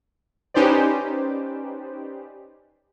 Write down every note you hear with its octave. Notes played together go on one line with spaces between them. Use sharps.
C#4 D#4 G4 B4 C5 D5